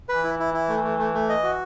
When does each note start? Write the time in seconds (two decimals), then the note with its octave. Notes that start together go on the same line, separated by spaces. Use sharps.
0.09 E3 B4
0.24 E4
0.39 E4
0.54 E4
0.69 A3
0.84 A3
0.99 A3
1.14 A3
1.29 D#5
1.43 F#4